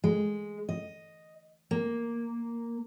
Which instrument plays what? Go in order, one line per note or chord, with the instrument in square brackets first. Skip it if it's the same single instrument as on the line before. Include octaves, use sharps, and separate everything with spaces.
[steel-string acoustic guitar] G#3
D#5
A#3